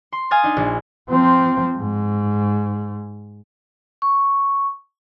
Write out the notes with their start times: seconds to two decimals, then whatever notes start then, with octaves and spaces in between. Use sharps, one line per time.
0.12 C6
0.31 F5 G#5 D#6 F6 A6
0.44 D4 D#4
0.57 A#1
1.10 F3 C4
1.77 G#2
4.02 C#6